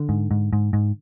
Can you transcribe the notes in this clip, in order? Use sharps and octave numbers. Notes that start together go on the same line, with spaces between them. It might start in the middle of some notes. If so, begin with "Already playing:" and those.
Already playing: D3
G#2
G#2
G#2
G#2